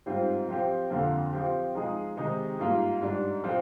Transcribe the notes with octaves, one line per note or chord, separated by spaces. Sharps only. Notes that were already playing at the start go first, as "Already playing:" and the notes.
G#2 G3 C4 F4
F3 C4 G4
F2 D3 F3 A#3
F3 C4 G4
F3 G#3 D#4 G#4
C3 D#3 G#3 D#4 G4
G#2 G3 A#3 F4
G#2 G3 D4
F3 C4